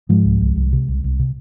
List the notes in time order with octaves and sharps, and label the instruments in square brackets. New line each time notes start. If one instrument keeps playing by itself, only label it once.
[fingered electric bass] G#2 F3 G#3
C2
C2
C2
C3
C2
C2
C3